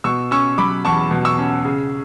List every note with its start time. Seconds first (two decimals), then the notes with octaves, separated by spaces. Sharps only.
0.04 B2 C#6 E6
0.31 C#4 C#6 E6
0.58 F#3 B5 D6
0.85 E2 A5 C#6
1.11 B2
1.25 C#6 E6
1.38 C#4
1.65 C#3